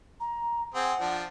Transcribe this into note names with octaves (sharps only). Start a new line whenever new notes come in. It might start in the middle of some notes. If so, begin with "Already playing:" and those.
A#5
C4 G#4 F#5
F3 D4